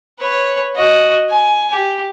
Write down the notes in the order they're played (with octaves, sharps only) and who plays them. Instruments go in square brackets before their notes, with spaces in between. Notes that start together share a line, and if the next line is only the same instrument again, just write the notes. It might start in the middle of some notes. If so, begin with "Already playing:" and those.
[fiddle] B4 C#5
F#4 D#5
G#5
G4